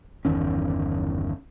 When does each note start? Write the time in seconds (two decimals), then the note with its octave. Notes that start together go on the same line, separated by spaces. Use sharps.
0.25 G1 E2 D#3 C#4